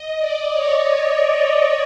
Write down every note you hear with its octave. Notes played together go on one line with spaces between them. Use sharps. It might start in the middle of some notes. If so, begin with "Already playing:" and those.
Already playing: D#5
D5
C#5